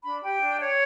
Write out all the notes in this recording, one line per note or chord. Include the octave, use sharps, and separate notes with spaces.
D4 B5
G4 G5
D4
C#5